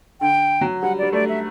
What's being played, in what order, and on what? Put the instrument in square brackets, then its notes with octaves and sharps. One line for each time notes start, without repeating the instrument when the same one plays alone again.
[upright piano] D3 [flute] G5
[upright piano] F#3
[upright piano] G3 [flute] F#5
[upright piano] G3 [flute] D5
[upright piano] A3 [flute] D5
[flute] E5